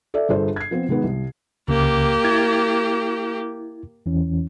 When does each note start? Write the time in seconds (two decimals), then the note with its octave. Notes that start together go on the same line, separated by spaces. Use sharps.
0.14 A4 D5 E5
0.29 G1 G#4 A4 C5
0.56 G#6 C7
0.71 F3 B3 C4 F4
0.89 D#3 G#3 B3
1.04 C2
1.68 C#2 C#3 A#3 G4
2.25 E4 G#6 A6
4.06 E2 E3 C#4